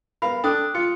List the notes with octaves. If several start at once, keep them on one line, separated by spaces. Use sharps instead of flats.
B3 A#4 F5 B5
D4 A4 G5 D#6 F#6
F4 C#7